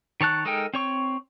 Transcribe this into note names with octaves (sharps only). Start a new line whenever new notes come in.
D#3 C#5 A5 F#6
G#3 D#4 A4 A#4 G5
C4 C#5 C#6